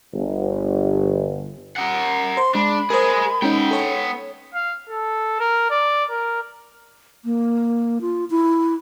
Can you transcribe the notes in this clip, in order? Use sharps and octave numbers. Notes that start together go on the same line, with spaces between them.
G1
A#4 F#5
C5 C6
G#3 D4 B5
G#4 A#4 C5 D#5
G#3 B3 C#4 D#4 G5
A4 C#5
F5
A4
A#4
D5
A#4
A#3
F4
E4